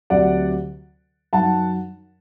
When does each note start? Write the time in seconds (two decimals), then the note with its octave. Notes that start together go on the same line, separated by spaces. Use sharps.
0.10 D2 C3 F#3 D5 F#5
1.33 F#2 D#3 F#3 F#5 A5